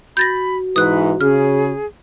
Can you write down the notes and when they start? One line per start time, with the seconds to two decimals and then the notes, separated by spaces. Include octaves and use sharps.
0.17 F#4 B5 G6 A6 A#6
0.76 G#2 E3 B4 D#6 F#6
1.21 C#3 G#4 F6